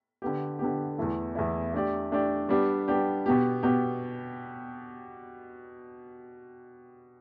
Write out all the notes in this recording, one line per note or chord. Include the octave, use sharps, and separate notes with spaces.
D3 B3 G4
D3 B3 G4
E2 E3 A3 E4
E2 E3 A3 E4
A3 D4 G4 D5
A3 D4 G4 D5
G3 B3 D4 G4
G3 B3 D4 G4
B2 B3 G4
B2 B3 G4